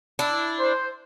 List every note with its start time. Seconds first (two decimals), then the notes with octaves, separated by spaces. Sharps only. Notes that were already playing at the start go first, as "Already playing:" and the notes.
0.19 D4 E4
0.60 C5